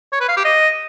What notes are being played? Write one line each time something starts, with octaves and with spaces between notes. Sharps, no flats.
C#5
B4
F5
G4
D#5